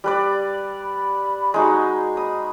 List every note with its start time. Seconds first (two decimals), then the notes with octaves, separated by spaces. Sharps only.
0.04 G3 B4 D5
0.82 B5
1.54 G#3 D#4 F#4
2.17 B5 D#6